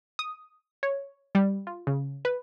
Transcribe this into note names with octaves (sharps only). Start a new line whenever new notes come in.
D#6
C#5
G3
F4
C#3
B4